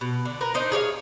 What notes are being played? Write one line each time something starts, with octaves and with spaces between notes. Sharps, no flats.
B2
D3
A#4 B4
D4 D#4 C5
G#4 C#5 D5 F5